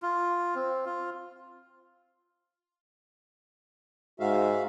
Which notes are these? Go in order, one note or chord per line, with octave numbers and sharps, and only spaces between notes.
F4
C4
F4
G#2 F#4 E5 F5